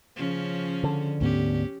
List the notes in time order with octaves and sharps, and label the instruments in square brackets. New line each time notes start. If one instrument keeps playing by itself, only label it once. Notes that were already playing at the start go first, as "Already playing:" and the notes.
[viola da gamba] C#3 F3 C#4
[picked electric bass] D3
[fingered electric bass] D2 G#2 B3 [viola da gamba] C#4 G4